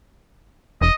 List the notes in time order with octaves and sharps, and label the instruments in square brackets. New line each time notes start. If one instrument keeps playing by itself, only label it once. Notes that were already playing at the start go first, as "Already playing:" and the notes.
[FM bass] E1 [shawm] D#5